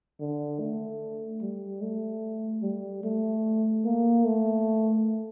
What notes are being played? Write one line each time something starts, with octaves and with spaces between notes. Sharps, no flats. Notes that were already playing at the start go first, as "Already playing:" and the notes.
D3
A3
G3
A3
G3
A3
A#3
A3